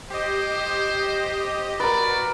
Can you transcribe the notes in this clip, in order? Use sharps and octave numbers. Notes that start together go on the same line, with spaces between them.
G4 C5 D#5
F#4 A#4 B4 D5